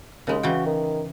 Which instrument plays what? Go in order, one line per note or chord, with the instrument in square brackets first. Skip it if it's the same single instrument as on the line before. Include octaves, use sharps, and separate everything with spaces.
[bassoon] D#2 [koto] C#3 G#3
[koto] C#3 E3 G5 [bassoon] F#4
[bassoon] D#3